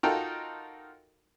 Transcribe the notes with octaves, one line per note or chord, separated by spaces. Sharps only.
D#4 F4 F#4 A4 A#4 G5